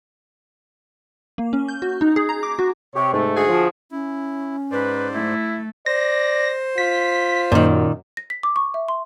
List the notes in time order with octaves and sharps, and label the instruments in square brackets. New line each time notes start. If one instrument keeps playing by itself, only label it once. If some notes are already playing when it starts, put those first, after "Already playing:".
[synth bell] A#3
C#4
G6
F#4
D#4
G#4
A#5
D6
F#4
[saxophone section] C3 [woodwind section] G4 C#5
[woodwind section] G#2 A3
[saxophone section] D3 F#4 G#4
[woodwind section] F3
[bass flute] C#4 [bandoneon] E4
[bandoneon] G#2 C5 D5 [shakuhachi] B4
[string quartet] A3 [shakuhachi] E4
[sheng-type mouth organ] C5 [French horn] D5 [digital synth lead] A#6
[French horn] F4 [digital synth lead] B6
[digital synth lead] F#2 [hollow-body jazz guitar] A#2 D#3
[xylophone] A#6
B6
D6
C#6
E5
C6